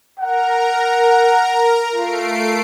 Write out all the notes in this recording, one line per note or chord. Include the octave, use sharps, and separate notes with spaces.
A#4 F#5 A#5
A3 F4 C7 D7